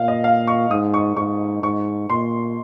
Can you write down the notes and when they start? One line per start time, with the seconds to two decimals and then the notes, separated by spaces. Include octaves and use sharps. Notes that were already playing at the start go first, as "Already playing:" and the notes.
Already playing: A#2 F5
0.08 D#5
0.24 F5
0.47 C#6
0.70 G#2 D#6
0.94 C#6
1.17 G#2 C#6
1.63 G#2 C#6
2.10 A#2 C6